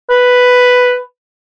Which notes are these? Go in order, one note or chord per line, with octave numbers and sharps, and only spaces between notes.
B4